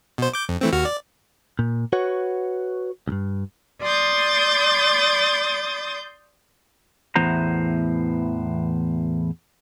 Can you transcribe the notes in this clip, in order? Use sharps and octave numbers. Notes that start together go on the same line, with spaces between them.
B2 C5
D6 G6
F2
E3 A3 C4
D#2 F#4 F6
D5
A#2
F#4 B4 C#5 F#5
C2 G2
D5 C6 D#6 G6 A6
E2 A2 E3 B3 C5 A#5